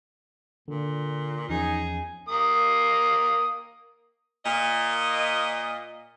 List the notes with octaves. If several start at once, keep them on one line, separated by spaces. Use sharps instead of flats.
A#2 D3
E2 F3 C#4 D#4 G#4
A#3 D#6
A#2 D#5